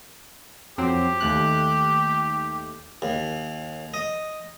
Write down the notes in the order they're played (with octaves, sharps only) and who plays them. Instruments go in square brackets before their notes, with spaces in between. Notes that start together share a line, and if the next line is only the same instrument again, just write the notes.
[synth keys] F2 F#3 C4 [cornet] G4
[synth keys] D#2 A3 F#6
[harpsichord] D#2
D#5